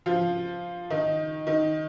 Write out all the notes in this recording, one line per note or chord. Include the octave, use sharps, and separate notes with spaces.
F3 F4
D#3 D#4
D#3 D#4